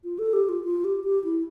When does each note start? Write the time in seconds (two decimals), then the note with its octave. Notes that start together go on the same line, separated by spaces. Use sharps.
0.04 F4
0.19 A4
0.33 G4
0.49 F4
0.64 F4
0.84 G4
1.04 G4
1.24 E4